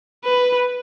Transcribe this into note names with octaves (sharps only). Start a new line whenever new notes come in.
B4